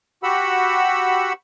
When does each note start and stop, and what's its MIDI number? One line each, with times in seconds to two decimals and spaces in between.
0.23 1.33 66
0.23 1.33 67
0.23 1.33 78
0.23 1.33 83
0.23 1.33 88